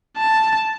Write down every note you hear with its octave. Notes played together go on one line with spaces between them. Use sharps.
A5